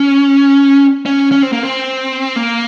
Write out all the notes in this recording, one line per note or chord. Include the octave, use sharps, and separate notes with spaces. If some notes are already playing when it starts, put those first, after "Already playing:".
Already playing: C#4
C#4
C#4
C4
A#3
C4
A#3